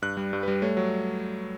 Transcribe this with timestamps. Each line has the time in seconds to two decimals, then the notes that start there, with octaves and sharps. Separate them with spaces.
0.02 G2 F#6
0.17 G3
0.33 G2
0.43 G3 B4
0.62 A3 C#5
0.77 F#3